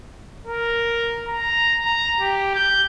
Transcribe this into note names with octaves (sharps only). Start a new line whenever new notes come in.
A#4
A#5
A#5
G4
G6